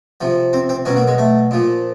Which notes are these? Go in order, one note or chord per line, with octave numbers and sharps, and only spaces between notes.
C3 F3
C4
C4
B2 F#3 C#4
A#3
G#3
A3
A#2 F3